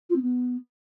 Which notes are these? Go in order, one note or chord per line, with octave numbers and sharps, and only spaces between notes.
F4
C4
B3